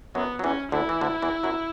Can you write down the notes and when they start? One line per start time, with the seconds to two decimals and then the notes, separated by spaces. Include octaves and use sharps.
0.15 F#2 F#3 B3
0.39 F#3
0.44 E2 E3 C#4
0.72 D2 D3 E4
0.89 E3
1.01 D2 D3
1.22 E2 E3
1.43 F#2 F#3